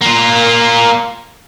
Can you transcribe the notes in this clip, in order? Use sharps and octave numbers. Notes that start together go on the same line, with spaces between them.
A#3 F4